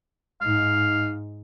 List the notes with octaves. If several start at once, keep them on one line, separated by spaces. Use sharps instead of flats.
G#2 D#4 F5